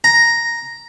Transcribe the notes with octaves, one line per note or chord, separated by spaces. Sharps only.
A#5